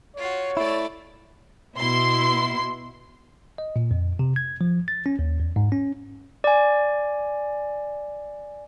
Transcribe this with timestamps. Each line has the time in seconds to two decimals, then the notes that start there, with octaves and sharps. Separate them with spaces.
0.17 F4 F#4 C#5
0.57 A3 E4 D5
1.78 B2 E4 C6
3.58 D#5
3.76 A#2
3.91 F2
4.19 C3
4.36 G#6
4.61 F3
4.88 A6
5.06 C#4
5.19 D#2
5.40 E2
5.56 G#2
5.72 C#4
6.44 D5 G#5